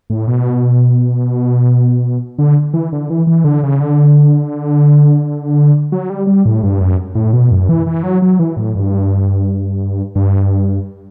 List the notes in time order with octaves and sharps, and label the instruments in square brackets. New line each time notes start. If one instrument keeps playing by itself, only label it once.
[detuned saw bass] A2
B2
D3
E3
D3
E3
E3
D3
C#3
D3
F#3
G3
G3
A2
G2
F#2
A2
B2
F#2
E3
E3
F#3
F#3
E3
A2
G2
G2